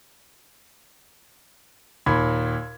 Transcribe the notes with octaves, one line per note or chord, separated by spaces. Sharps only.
D#2 A#2 B5 G#6